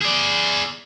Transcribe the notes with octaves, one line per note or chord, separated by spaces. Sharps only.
G#4 D5